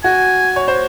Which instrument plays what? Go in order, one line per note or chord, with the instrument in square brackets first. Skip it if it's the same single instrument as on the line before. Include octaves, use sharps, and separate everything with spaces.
[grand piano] F#4 [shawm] G#5
[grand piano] C#5
C5